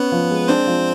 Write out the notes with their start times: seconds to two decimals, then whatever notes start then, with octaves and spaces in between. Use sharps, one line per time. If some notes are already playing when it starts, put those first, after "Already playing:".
Already playing: B3 C#4 B4
0.12 F3
0.31 G#3
0.48 C4 D4 C5
0.67 F3